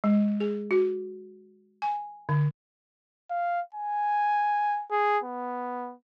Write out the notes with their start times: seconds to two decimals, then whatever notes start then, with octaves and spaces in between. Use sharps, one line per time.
0.04 G#3
0.40 G#4
0.71 F#4
1.82 G#5
2.29 D3
3.30 F5
3.75 G#5
4.91 G#4
5.24 B3